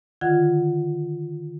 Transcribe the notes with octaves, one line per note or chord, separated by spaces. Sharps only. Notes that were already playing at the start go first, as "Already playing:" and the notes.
D3 D#3 F4 F#5 G#6